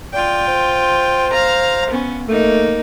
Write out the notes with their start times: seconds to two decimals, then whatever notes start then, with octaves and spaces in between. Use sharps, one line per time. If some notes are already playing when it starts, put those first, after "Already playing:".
0.14 F4 D5 G5
0.48 C5
1.33 F5 A#5
1.90 B3 C#4
2.28 A3 A#3 D#4